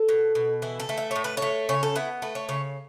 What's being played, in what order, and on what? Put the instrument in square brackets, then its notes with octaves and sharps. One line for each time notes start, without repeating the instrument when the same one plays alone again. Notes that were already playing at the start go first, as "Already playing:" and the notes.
Already playing: [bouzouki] A4
B2
B2
E3 E4
A4
A3
E5
A2 C#5
B4
C#5
A3
C#3 C#5
A4
B3 E4
A3 B4
C#5
C#3 C#5